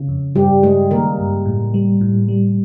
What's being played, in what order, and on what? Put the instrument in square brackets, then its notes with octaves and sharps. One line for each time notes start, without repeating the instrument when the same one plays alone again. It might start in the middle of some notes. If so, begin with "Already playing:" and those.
Already playing: [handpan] C#3
[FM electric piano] F2
[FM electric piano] G2 [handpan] G3 G4
[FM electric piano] G2 [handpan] G#3 G#4
[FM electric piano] D#3 [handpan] A#3 A#4
[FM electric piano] G2
A2
G3
A2
G3